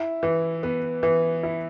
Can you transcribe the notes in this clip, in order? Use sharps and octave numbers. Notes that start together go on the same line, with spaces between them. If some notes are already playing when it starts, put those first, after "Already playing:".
Already playing: E4
E3
B3
E3
E4